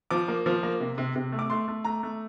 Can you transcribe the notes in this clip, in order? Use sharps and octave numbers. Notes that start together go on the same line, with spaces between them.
F3 D6
A#3
F3
A#3
C3
C3
C3
A3
D6
A3 C6
A3
A3 A#5
A3